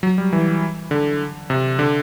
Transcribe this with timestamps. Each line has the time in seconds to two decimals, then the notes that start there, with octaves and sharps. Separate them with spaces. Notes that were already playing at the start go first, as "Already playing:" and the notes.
0.03 F#3
0.18 G3
0.33 E3
0.91 D3
1.50 C3
1.79 D3